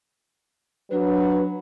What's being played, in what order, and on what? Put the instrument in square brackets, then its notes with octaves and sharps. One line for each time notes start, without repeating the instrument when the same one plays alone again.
[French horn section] F#3 B4 [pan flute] D4